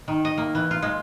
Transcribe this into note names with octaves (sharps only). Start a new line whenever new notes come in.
D#3
D#5
A#3
E3
F4
G#3